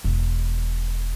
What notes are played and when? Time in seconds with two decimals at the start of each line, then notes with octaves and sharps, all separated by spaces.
0.04 E1